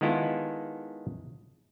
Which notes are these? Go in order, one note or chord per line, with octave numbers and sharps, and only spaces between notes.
D#3 G#3 B3 E4 F4 A4